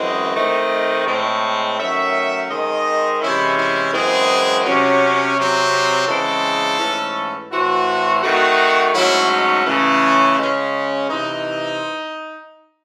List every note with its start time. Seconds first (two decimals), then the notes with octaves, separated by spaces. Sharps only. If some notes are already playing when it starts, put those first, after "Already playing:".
Already playing: F#2 E3 G#3 C4 D#5
0.34 D#3 A3 C4
1.06 A2 G#3 C4
1.77 D#3 F#3 A3 C#4 E5
2.49 D#3 G#3 C4 D#5
3.21 C3 E3 G#3 C#4 E4
3.57 E4
3.93 F#2 E3 G#3 C4 G#4
4.64 C3 F#3 C#4
5.36 C3 F#3 C4
6.07 C#3 E3 G#3 C4 A4
6.79 G#2 E3 A3 C#4
7.51 A2 E3 C4 F#4
8.22 D#3 A3 C4 F#4
8.93 G#2 F#3 A3 C#4 E4
9.30 D#4
9.65 C#3 E3 A3 C#4
10.37 C#3 G#3 C#4
11.09 C3 E3 C4 D#4